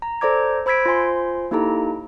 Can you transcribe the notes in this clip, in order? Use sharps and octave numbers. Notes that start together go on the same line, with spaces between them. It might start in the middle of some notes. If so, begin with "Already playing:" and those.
A#5
A4 C5 D5 A#5 D6 G#6
C5 B5 E6 G#6 B6 D7
F4 C5 G#5 C6
A#3 D#4 E4 G4 A4 A#5